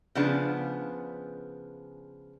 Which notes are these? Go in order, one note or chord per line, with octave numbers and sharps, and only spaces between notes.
C#3 F3 B3 D4 G#4